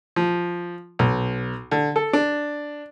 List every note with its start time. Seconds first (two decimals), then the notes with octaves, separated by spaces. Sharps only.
0.16 F3
0.99 B1
1.71 D3
1.96 A4
2.13 D4